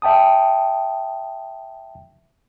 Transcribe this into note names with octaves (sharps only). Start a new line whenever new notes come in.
E5 G5 A5 D#6